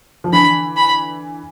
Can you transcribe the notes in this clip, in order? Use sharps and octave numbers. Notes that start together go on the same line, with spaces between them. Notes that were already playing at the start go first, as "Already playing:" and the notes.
F3
D3 E3 B5
B5